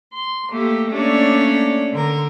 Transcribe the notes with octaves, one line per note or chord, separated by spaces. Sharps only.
C6
A3 A#3 G4
A3 A#3 C#4 D4 C#5 D5
D3 A#4